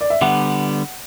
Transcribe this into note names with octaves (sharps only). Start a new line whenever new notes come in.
D5
E5
D3 G3 B3 F#5